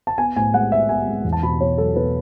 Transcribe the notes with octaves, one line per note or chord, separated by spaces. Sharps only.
A5
B3 G#5
A2 G#5
G#3 F#5
B3 E5
B3 G#5
G#3
E2
A5
B2 B5
B2 C#5
F#3 A4
B2 B4